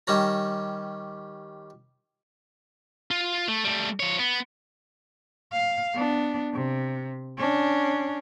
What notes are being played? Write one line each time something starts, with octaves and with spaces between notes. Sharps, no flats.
D#3 G3 C#4 A#5
F4
A3
G3 A3
F3 C#5
B3
F5
B3 D4
C3
C#4 D4